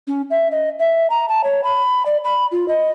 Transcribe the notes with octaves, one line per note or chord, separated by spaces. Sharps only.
C#4
E5
D#5
E5
A#5
A5
C#5
B5
D5
B5
F4
D#5